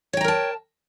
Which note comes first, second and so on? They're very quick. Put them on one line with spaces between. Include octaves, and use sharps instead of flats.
C#5 G5 A#5 A#4 A5